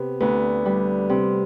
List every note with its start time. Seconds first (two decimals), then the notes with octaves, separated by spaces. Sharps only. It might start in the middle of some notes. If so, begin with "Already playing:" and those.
Already playing: C3 B3
0.20 D2 B3
0.65 G3
1.09 C3